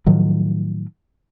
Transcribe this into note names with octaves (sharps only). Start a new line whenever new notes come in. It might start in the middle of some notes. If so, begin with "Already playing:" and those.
A2 D#3 F3 F#3